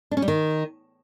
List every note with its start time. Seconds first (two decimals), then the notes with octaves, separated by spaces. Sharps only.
0.11 D4
0.17 C#4
0.22 G3
0.28 D#3